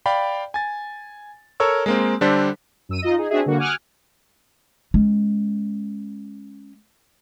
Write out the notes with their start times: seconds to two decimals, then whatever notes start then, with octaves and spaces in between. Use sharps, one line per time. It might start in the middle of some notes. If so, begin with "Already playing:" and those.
0.06 D5 F5 G5 B5
0.54 G#5 A6
1.60 A4 A#4 C#5 C#6 E6
1.86 G#3 A#3 C4
2.21 D3 G3 D4 A4 C5 B6
2.89 F#2 E6 D#7
3.02 D#4 F4 D#5
3.17 D#4 G#4
3.30 C4 D4 F#4 G#4 E5
3.46 D3 G3 A#3 F#4
3.58 F#5 G#5 D6 D#6 F6 F#6
4.94 G#3 C#4